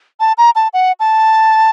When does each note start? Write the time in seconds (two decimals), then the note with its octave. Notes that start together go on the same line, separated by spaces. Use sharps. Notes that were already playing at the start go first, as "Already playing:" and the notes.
0.20 A5
0.38 A#5
0.56 A5
0.73 F#5
1.00 A5